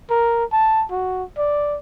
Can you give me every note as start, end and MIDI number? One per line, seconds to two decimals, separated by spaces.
0.10 0.45 70
0.53 0.85 81
0.91 1.23 66
1.38 1.78 74